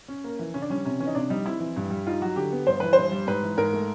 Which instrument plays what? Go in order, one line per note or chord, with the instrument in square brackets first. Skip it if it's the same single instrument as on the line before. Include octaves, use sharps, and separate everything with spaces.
[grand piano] C#4
A#3
E3
[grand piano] C#3 [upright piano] C#4
[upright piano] D4
[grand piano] G3 [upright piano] C#4
[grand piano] C3 [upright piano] C#4
[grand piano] E3 [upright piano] C#4
[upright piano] D#4
[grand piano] C3 [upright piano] D4
[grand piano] G3 [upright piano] D#4
[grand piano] C4 [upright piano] E4
[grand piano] E3
G2
G3
[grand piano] D#4 [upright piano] F4
[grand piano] F#3 [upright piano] F#4
[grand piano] D3 [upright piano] G4
[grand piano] B3
[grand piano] G2 [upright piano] C5
[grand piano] E3 [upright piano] B4
[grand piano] G2 [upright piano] C5
[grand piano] G3
[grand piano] G#2 [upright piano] B4
[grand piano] E3
[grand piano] G#2 [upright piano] A#4
[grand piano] A3